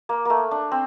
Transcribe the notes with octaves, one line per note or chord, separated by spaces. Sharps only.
A#3
A3 A#3
D4
C4